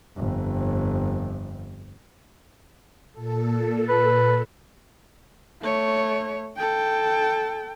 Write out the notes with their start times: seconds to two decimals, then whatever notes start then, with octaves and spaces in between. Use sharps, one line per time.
0.17 G1 F2
3.13 A#2 A4
3.89 B4
5.62 A3 C#5
6.57 A4 G5